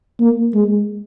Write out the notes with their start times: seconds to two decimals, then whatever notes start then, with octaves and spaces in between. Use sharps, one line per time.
0.20 A#3
0.54 G#3